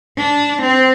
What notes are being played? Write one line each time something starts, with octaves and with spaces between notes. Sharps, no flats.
D4
C4